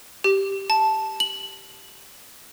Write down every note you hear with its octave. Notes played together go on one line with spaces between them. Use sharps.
G4
A5
F#7